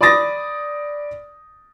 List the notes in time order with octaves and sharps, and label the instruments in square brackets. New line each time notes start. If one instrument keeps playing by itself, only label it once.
[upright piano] D5 B5 D6 D#6 A6 A#6